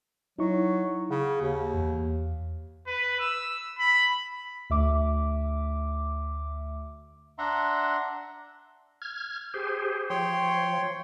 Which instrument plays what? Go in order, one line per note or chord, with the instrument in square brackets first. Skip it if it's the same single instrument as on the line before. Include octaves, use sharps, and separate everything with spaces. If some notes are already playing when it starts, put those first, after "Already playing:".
[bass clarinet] F#3 [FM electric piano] D#4 E4 C#6
[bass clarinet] C#3 [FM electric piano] F#5
[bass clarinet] D#2
[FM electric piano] E2
[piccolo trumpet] B4
E6
B5
[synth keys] D2 E5 D6
[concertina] D4 E5 F#5 A#5 C6
[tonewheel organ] F6 G#6
G4 G#4 C5
[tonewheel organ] F3 [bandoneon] C#5 G5 C6